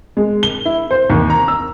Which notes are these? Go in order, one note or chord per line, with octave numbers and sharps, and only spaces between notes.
G#3
G7
E4
C5
D#2
A#5
E6